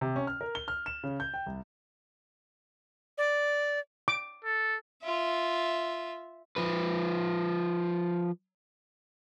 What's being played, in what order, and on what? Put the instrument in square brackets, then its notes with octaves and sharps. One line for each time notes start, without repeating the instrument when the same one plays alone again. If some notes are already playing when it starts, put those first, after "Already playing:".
[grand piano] C3
C#4
F6
A#4
G7
F6
E7
C#3
G6
G5
C2
[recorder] D5
[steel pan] D6
[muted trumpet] A4
[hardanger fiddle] F4 E5
[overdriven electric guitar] F3 B4